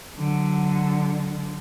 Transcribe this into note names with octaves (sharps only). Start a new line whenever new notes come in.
D3 F#3